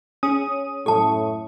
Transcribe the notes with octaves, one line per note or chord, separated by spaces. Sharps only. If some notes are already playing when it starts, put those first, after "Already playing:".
C#4 G#4 D#6
F#2 A2 A4 A5 C#6